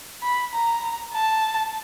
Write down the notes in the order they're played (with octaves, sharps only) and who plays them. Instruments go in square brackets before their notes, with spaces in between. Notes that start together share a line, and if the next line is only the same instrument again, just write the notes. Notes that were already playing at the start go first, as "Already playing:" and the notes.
[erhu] B5
A#5
A5